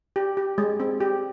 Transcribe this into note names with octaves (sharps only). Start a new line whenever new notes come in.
G4
G4
G#3
C4
G4